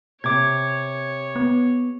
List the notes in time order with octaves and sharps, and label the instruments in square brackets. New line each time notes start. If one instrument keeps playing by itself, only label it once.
[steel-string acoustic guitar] C3 [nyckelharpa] C#5 [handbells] D6 G#6
[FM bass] B3